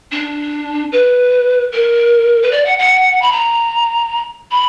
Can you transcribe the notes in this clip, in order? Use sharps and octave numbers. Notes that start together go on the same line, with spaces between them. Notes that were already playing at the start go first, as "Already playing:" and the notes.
D4
B4
A#4
B4
D5
F#5
F#5
B5
A#5
B5